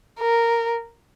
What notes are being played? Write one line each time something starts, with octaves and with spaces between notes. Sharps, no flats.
A#4